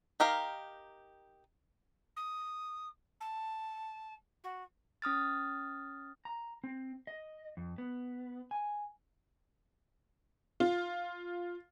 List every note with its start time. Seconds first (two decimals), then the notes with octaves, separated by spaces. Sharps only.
0.20 D#4 G4 A#4 F5
2.17 D#6
3.21 A5
4.44 F#4
5.02 C#4 D#6 F6 A6
6.25 A#5
6.64 C4
7.07 D#5
7.57 F2
7.78 B3
8.51 G#5
10.60 F4